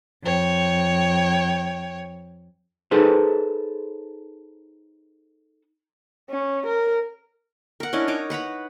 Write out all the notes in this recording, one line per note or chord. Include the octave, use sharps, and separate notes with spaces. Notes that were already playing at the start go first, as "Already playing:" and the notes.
F2 C#5 G5
D#4 G#4 A4 B4 C5
C#4
A#4
A#4 F#5
C#4 D4 E4 D#5
D#4 C#5 D#5 D6
B4 F#5 A#5 B5